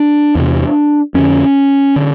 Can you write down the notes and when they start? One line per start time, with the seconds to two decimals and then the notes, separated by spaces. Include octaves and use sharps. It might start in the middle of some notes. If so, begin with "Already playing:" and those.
Already playing: D4
0.35 E2 C3
1.14 F2 D3 C#4
1.96 D3